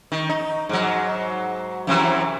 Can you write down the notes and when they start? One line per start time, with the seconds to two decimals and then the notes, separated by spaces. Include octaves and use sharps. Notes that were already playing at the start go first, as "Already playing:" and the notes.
0.12 D#3
0.29 D#4
0.69 G#2 F#3
1.87 F#2 C3 E3